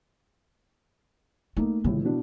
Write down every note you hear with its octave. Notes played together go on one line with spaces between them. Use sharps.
A3 A#3 D#4
G1 C#2 A2 E3
B2 D4 E4